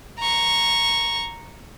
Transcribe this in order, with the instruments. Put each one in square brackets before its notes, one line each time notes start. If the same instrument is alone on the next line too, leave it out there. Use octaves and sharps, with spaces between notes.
[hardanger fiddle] A#5 C#6